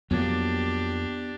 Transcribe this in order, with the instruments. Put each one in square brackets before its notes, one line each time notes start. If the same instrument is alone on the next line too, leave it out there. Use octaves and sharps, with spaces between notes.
[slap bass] F2 [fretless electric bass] F#3 A#3 [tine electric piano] B3 [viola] D4 G4